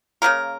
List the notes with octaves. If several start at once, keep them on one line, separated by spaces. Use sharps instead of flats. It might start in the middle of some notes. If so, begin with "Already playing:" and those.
C#3 F3 A#3 A#4